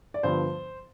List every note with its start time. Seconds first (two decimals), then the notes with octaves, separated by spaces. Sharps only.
0.14 D5
0.23 G2 D3 F3 B3 C5